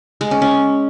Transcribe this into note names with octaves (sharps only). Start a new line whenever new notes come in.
G#3
C#4
C#4